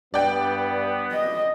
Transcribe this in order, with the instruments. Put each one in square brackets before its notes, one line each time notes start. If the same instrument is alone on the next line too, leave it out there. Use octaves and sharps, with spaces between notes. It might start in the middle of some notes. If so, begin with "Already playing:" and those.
[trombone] G2 [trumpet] B3 [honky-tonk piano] D5 G5
[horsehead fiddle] D#5